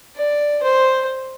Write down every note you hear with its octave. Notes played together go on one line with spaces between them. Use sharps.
D5
C5